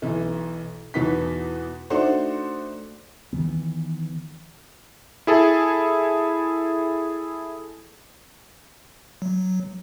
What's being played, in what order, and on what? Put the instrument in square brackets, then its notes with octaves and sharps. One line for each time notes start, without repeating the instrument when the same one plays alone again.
[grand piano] B1 E3
E2 B2 B3 D#4 B6
A3 D4 D#4 F#4 A4 C5
[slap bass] D#3 E3 B3
[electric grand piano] E4 G#4 A4 A5
[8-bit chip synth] F#3